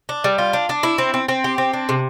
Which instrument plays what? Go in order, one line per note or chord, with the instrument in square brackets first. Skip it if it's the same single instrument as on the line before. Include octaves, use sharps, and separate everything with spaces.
[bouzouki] D4
G3
F4
D4
D4
E4
C4
C4
C4
G4
C4
D4
C3